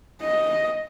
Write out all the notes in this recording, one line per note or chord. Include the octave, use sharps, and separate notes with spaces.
D#5